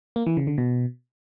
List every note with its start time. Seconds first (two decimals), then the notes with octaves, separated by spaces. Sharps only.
0.16 A#3
0.26 E3
0.37 C#3
0.47 D3
0.58 B2